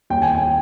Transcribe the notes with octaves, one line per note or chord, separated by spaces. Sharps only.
D#2 G5
G#5
G5